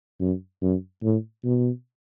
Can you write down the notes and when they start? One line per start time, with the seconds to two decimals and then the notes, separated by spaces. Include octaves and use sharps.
0.20 F#2
0.62 F#2
1.03 A2
1.44 B2